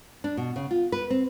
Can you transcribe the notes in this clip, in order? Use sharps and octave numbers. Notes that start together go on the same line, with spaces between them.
D4
B2
C#3
F4
B4
C4